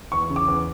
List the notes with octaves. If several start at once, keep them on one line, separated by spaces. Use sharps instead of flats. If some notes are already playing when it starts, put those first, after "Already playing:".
E2 C#6
C#3
D6
E2